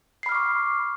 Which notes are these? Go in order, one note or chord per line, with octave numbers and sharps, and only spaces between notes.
B5 C#6 D6 F6 C7